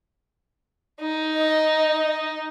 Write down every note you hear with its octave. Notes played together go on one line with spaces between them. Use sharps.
D#4
D#5